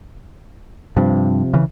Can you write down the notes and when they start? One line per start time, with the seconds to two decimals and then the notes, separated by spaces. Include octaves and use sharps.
0.97 G2 C3 F3
1.53 C#3 E3